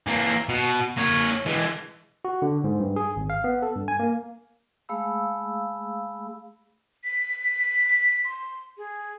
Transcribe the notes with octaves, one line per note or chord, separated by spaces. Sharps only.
E3 A#3
B2
A#3 C#5
E3 G#3
F#4
D3
G#2
G2
G#4
G#1
F5
B3
A4
G2
G#5
A#3
G#3 A3 G#4 F5 B5 E6
B6
C6
G#4